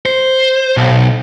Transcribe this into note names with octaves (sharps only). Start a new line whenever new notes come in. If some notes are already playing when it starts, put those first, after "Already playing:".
C5
B1